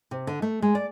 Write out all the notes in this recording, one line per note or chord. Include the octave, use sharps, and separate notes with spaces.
C3
D3
A3
G#3
D5